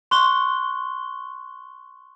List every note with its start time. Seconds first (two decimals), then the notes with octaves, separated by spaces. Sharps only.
0.11 C6 C#6 F#6 G7